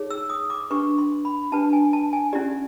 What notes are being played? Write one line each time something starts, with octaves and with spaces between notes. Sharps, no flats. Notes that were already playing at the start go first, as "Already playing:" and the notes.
Already playing: D#4 G#4 C#5
E6
D#6
D6
D4 G4 B4 C#6
C6
B5
D4 G4 B4 A5
G#5
A5
G#5
C#4 E4 G4 D5